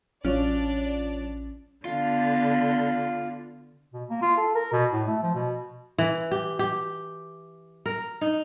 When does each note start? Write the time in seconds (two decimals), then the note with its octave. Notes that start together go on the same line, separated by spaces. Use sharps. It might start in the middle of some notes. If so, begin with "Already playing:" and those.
0.25 A1 F#3 C#4 D4 F4 C#5 D5
1.85 D3 B3 F4
3.93 B2
4.10 A#3
4.22 F4
4.37 A4
4.55 A#4
4.72 B2
4.92 A2
5.07 A3
5.23 F3
5.34 B2
5.98 E3
6.31 G4
6.59 G4
7.86 A#4
8.21 D#4